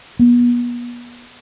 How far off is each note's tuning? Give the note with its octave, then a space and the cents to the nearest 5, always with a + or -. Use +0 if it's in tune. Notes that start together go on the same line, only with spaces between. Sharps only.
B3 -35